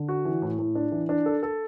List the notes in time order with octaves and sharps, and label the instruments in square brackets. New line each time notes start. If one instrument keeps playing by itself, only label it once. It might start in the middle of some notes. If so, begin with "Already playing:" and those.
Already playing: [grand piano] D3
F#4
E3
A2
A2
D4
E3
D4
A4
A4